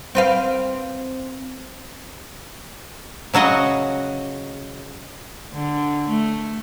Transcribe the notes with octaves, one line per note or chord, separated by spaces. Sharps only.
C4 B4 F5
C#3 F#3 F#4 D#5 F#5
D3
A3